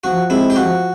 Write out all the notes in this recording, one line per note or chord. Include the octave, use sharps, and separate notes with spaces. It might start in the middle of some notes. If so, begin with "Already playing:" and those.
F3 F#4
G#3 C4 E4
G4
F3 F#4